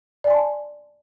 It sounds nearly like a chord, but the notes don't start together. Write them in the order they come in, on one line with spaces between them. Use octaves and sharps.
D5 G#5 C6 A5